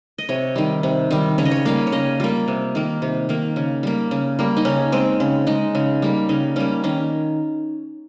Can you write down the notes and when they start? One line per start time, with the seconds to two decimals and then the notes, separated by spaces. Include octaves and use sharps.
0.18 D#5
0.29 C3 C#5
0.56 D#3 G3
0.83 C3
1.11 D#3 G3
1.38 C#3 C#5
1.45 D#5
1.51 C#5
1.65 G3 A#3 F5
1.87 C#5
1.92 C#3 D#5
2.20 G3 A#3 F4
2.48 C3
2.75 D#3 A#3
3.02 C3
3.29 D#3 A#3
3.56 C#3
3.83 G3 A#3
4.11 C#3
4.39 G3 A#3
4.57 D#4
4.65 C#3 C#4
4.92 G#3 C4
5.20 C#3
5.47 G#3 D#4
5.75 C#3
6.02 G3 A#3
6.29 C#3 D#4
6.56 G3 A#3 C#4
6.84 D#3 C#4